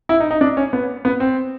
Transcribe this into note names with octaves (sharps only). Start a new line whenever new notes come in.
E4
D#4
D#4
D4
C#4
B3
B3
C4